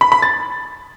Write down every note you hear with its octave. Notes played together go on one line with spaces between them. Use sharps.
B5
B5
A6